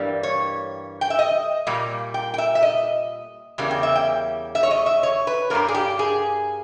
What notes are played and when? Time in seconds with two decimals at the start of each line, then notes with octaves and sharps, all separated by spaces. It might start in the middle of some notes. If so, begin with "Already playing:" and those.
Already playing: G2 E3 G3 A#3
0.23 C#5
1.01 G5
1.10 E5
1.19 D#5
1.67 A#2 G3 A#3
2.14 G5
2.34 G5
2.38 E5
2.55 E5
2.63 D#5
3.58 E2 C#3 G3 A#3
3.71 G5
3.83 E5
3.95 G5
4.55 E5
4.63 C#5
4.71 D#5
4.86 E5
5.03 C#5
5.27 B4
5.50 G2 G3 A#3 A#4
5.68 G#4
5.74 G4
5.99 G#4